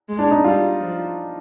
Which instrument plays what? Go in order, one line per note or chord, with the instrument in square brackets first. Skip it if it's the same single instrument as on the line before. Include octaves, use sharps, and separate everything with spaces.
[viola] G#3
[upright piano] D4
D#4
[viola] G3 [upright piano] F4
[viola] F3